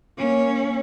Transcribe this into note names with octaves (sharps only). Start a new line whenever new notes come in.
A#3 C#4